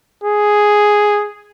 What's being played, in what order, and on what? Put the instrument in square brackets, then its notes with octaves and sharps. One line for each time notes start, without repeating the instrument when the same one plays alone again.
[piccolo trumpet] G#4